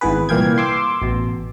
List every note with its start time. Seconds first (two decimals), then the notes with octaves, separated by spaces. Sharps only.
0.01 G#1 G#2 E3 B3 G#4 B4
0.29 C2 A#2 E3 F5 G5 G#6
0.58 C6 D6 E6
1.02 A1 B2